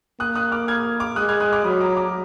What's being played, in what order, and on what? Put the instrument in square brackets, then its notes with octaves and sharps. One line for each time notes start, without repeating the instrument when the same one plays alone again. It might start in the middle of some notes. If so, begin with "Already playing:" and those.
[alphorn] A#3 [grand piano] D#6 F#6
[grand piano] D#6 F#6
D6 F6
F6 G#6
D6 F6
[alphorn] G#3 [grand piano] D#6 F#6
[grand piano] F6 G#6
D#6 F#6
D6 F6
[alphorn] F#3 [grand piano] B5 D#6
[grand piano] A#5 D6
A#5 D6